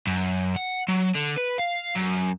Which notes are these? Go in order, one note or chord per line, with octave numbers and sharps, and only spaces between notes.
F#2
F#5
F#3
D3
B4
F5
F#2